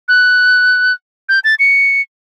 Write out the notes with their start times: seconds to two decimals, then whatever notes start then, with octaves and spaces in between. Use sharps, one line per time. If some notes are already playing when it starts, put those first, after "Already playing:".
0.08 F#6
1.29 G6
1.44 A6
1.59 C#7